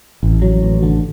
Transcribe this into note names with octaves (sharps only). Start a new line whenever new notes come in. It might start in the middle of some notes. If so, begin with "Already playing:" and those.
A1
F#3
A1
D3